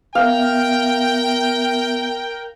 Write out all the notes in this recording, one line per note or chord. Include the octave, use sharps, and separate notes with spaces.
B3 A#4 E5 F5 G5